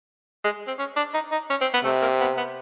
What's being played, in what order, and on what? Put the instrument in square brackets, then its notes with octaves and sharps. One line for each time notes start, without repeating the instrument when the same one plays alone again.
[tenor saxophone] G#3
C4
C#4
D4
D#4
D#4
C#4
C4
B3
[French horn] C3 [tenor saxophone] A3
[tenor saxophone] A#3
B3
B3